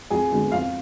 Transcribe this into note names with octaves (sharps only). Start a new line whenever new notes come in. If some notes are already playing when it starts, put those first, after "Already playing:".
F2 G#4 G#5
D3 G#3 B3 D4
F2 F4 F5